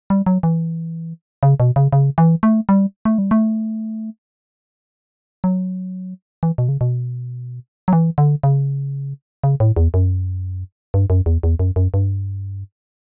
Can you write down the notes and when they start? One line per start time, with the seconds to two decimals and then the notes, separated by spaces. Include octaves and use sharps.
0.10 G3
0.26 F#3
0.43 E3
1.43 C#3
1.60 B2
1.76 C#3
1.93 C#3
2.18 E3
2.43 A3
2.69 G3
3.05 A3
3.18 G3
3.31 A3
5.44 F#3
6.43 E3
6.58 B2
6.69 C#3
6.81 B2
7.88 F#3
7.93 E3
8.18 D3
8.43 C#3
9.44 C#3
9.60 A2
9.76 E2
9.94 F#2
10.94 G2
11.10 F#2
11.26 E2
11.43 E2
11.59 F#2
11.76 F#2
11.94 G2